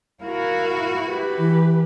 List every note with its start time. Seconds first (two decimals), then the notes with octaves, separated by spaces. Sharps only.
0.24 E4 F#4 A#4 F5
1.07 G4 B4
1.38 E3